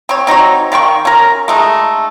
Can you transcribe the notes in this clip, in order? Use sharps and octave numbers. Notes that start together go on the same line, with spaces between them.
C4 C#5
C4 D#4 F#4 C#5
D#3 F5 G5 C#6
C#4 A#4
G#3 A3 D#4